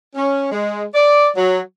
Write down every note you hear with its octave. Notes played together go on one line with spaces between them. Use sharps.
C#4
G#3
D5
F#3